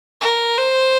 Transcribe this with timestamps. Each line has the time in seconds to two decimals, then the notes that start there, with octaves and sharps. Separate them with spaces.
0.22 A#4
0.58 C5